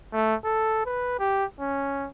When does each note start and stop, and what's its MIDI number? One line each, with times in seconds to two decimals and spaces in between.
0.13 0.35 57
0.45 0.83 69
0.86 1.18 71
1.19 1.45 67
1.60 2.08 61